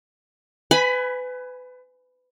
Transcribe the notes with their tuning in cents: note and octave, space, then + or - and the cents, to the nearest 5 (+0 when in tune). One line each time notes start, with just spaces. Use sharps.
B4 +30 G#5 +0 B5 +0